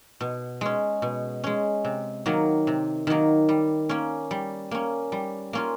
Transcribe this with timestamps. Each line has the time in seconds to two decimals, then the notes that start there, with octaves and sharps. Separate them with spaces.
0.21 B2
0.61 G#3 C#4
1.02 B2
1.44 G#3 C#4
1.85 C3
2.26 D#3 F#3 A#3
2.67 C3
3.07 D#3 F#3 A#3
3.49 G3
3.89 A#3 C#4
4.31 G3
4.71 A#3 C#4
5.12 G3
5.53 A#3 C#4 F4